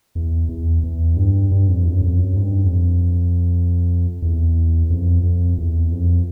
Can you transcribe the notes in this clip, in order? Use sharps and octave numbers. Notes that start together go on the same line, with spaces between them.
E2
E2
E2
G2
G2
F2
E2
F#2
F2
F#2
G#2
G2
F2
E2
F2
F2
E2
F2